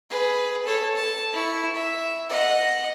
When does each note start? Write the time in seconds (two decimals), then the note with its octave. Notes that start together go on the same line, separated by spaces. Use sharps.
0.10 G#4 B4
0.65 A4 C#5
0.96 A5
1.33 E4 C#6
1.74 E5
2.29 D#5 F#5